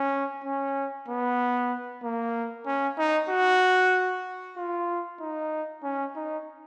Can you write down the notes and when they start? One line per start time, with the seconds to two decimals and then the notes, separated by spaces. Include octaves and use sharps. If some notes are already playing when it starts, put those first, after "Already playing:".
Already playing: C#4
0.44 C#4
1.08 B3
2.03 A#3
2.66 C#4
2.98 D#4
3.29 F#4
4.57 F4
5.20 D#4
5.83 C#4
6.15 D#4